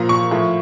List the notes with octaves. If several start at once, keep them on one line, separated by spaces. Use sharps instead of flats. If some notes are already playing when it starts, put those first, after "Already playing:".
Already playing: A#2 F3 A#5
C#6
A2 F3